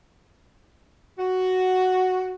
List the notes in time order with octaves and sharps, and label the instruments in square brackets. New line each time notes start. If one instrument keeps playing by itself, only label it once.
[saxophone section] F#4